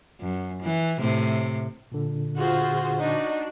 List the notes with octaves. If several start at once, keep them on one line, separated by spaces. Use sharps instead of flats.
F#2
E3
A2 C3
A#2 D3
F4 F#4 G#4 C5
D4 D#4 F#4